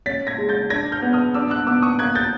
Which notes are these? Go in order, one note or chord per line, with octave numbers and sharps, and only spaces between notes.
C#4 A6 B6
G#6 A#6
G#3
G6 A6
D4 G#6 A#6
F6 G6
B3
D#6 F6
D4 D6 E6
E6 F#6
B3 D6 E6
C#6 D#6
A#3 F#6 G#6
G6 A6